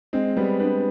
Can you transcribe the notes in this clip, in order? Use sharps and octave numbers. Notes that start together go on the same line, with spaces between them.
G#3 C4
G3 B3
B3 D4